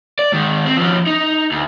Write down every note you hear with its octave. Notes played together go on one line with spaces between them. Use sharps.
D5
G#2 D#3
C4
F3 C#4
D#4
D2